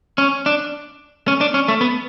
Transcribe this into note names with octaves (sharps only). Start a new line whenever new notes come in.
C#4
D4
C#4
D4
C#4
A3
B3